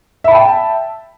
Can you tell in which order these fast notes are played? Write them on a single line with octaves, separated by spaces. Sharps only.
E5 B5 A5 G5